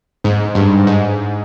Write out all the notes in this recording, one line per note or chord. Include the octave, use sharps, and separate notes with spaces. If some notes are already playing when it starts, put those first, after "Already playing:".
G#2
G2
G#2